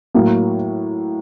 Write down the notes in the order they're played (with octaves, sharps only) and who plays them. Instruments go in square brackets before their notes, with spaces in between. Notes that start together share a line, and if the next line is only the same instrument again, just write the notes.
[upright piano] A2 F#3 A#3